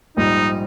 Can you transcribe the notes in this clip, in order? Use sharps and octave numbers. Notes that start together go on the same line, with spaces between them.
A#1 G#2 G3 D#4